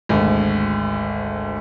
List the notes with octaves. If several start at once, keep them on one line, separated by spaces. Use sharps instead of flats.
G#1 D2